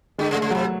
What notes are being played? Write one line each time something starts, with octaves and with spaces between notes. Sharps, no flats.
D3 G#3
C#3
A3
C#3
C3 F#3